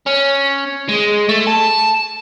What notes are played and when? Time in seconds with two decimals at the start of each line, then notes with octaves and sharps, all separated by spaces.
0.06 C#4
0.89 G#3
1.29 A3
1.47 A5